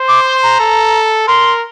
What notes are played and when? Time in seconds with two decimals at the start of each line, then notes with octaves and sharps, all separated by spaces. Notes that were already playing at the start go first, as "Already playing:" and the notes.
Already playing: C5
0.08 D6
0.26 C6
0.43 A#5
0.60 A4
1.27 A#4 C6